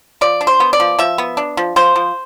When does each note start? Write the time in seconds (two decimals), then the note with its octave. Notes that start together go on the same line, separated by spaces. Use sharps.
0.21 F3 D5
0.41 D4
0.47 C5
0.60 B3
0.73 D5
0.80 F3
0.99 F3 E5
1.18 B3
1.37 D4
1.57 F3
1.76 F3 C5
1.96 F3